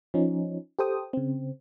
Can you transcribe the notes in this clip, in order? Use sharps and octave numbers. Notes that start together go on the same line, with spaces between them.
F3 C#4 D#4
G4 A4 C5 G5 D#6
C#3 C4